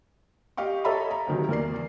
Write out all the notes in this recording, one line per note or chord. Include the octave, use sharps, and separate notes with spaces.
G4 D#5 F5 G5 C#6
A4 C#5 D#5 E5 A#5 B5
A#5
D2 C3 D#3 F#3
E2 A#3 D5 C7